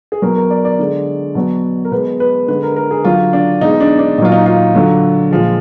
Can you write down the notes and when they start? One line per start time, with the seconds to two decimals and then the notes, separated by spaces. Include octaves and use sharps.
0.12 G#4
0.22 B2 F#3 A#4
0.36 A#4
0.50 D5
0.65 D5
0.79 D3 G#3
1.35 B2 F#3
1.85 A#4
1.91 B2 G#3 B4
2.20 B4
2.48 D3 G#3 B4
2.63 A#4
2.76 A#4
2.91 G#4
3.04 D3 F#3 F4
3.33 D4
3.61 B2 G#3 D#4
3.80 D4
3.99 D4
4.18 A#2 D#4
4.22 F#3 F4
4.32 D#4
4.46 F4
4.75 D3 F#3
5.31 A#2 F3 G#3